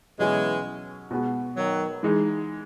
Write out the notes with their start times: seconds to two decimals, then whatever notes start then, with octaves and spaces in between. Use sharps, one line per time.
0.19 B2 E3 F#3 G#3 C#4 G#4
1.11 B2 G#3 B3 F#4
1.56 D#3 F#3
2.03 E3 G#3 D#4